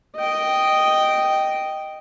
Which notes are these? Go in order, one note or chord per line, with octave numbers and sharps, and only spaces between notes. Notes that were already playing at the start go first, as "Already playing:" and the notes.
D#5 G5